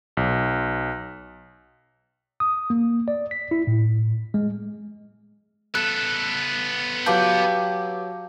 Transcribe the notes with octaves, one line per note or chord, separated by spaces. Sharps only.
B1
D#6
A#3
D5
B6
E4
A2
G#3
B3 A4 B4 F#6
F#3 F4 G4 B4 G5 A5 D6 G6